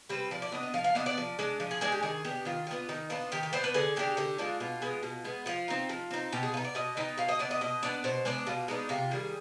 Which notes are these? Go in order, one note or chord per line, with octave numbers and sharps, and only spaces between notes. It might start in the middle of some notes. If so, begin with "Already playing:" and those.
G3 C4 B4
F3 D5
D5
B3 D4 D#5
D#5
F3 F5
F5
B3 D4 D#5
D5
F3
G#3 D4
F3
G#4
G#3 D4 G#4
G4
D#3 G#4
B3 D4 G4
D#3 F4
B3 D4 F4
D#3 D#4
B3 D4 F4
D#3 G4
G4
B3 D4 C5
B4
D3 G#4
G#3 D4 G4
D3 G4
G#3 D4 F4
B2 F4
G#3 B3
B2
G#3 B3
F3 F4
C4 D#4
F3
C4 D#4
B2 G4
G#4
B3 D#4 F4
D5
B2 D#5
B3 D#4 G5
B2 F5
D#5
B3 D4 D5
D#5
B2 D#5
B3 D4 D5
B2 C5
G#3 B3 D4 D5
B2 F4
G#3 B3 D4 D#4
C3 F4
D#3 G3 G#4